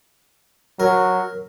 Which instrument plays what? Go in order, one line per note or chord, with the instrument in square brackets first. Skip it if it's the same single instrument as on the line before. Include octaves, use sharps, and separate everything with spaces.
[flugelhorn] F#3 [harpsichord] A#4